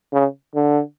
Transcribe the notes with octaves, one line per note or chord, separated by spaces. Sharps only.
C#3
D3